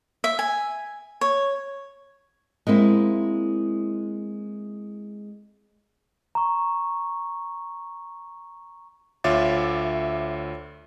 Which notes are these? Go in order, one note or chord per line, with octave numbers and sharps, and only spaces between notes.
E5
G#5
C#5
G#3 A#3 C4 E4
A#5 C#6
D2 F4 C#5 E5 D6 A6